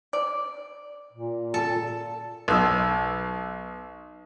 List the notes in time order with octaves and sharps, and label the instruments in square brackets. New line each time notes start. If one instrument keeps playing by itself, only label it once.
[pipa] D5
[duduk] A#2
[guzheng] A4
[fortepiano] B1 E6